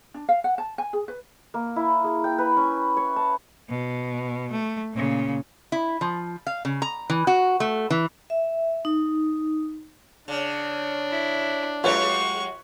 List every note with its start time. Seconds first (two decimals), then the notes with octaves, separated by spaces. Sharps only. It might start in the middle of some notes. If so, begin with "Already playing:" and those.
0.14 D4
0.29 F5
0.44 F#5
0.58 A5
0.78 G#5
0.93 G#4
1.08 B4
1.54 A#3
1.76 E4
2.04 G#4
2.24 G5
2.38 B4
2.57 C#4
2.97 C#5
3.16 A5
3.70 B2
4.52 A3
4.93 A#2 C#3
5.72 E4
6.01 F3
6.47 F5
6.65 C#3
6.82 A#5
7.10 E3
7.27 F#4
7.60 A3
7.91 E3
8.30 E5
8.85 D#4
10.28 C#3 D4
11.11 E4
11.84 F#3 G#3 F4 G4 B4 C#5 C#6